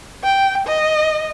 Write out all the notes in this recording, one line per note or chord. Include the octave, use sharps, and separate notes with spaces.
G5
D#5